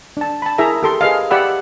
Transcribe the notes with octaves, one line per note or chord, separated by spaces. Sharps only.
D4 A5
A5 B5
E4 G#4 A#4 E5 A#5
G4 A4 C6
G#4 B4 D#5 F5
G4 D5 E5 F#5 B5 E6